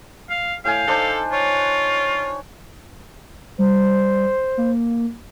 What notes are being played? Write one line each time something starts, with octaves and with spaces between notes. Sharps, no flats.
F5
A2 F5 G5 G#5
D4 D#4 A4 C5
F4 C#5
G3 C5
A#3